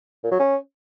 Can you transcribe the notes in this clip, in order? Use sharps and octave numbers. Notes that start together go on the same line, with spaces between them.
A#2
F#3
C#4